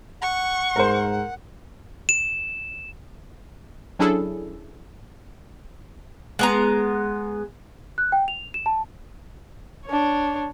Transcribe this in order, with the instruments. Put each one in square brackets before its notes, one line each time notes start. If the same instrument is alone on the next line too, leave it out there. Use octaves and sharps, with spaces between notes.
[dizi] F#5 [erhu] C#6
[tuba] G#2 [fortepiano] A#4 C5
[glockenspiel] E7
[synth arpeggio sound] F#3 C#4 D4 E4 G#4 A4
[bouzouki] G#3 B3 A#5
[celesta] F#6
G5
F7
E7
A5
[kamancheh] D4 C#5